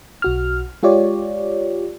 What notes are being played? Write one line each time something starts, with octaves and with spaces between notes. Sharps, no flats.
B1 F#4 F6
G#3 F4 G4 C#5 D5